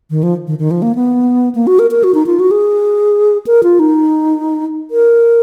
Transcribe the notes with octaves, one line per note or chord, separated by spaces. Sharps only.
D#3
F3
D#3
D#3
F3
A#3
B3
A#3
F#4
A#4
A#4
F#4
D#4
F4
F#4
G#4
A#4
F4
D#4
A#4